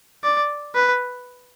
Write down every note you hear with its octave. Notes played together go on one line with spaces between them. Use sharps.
D5
B4